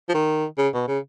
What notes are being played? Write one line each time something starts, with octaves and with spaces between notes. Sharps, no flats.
F3
D#3
C#3
B2
C#3